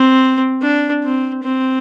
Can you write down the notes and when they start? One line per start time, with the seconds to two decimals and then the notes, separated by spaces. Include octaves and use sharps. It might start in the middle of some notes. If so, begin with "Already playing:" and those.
Already playing: C4
0.63 D4
1.04 C4
1.43 C4